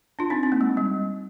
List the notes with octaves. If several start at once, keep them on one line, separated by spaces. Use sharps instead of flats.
D4 F4
C4 D#4
C4
A#3
G#3
G3